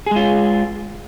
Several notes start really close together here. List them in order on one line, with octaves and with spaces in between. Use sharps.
G#4 G#3 F4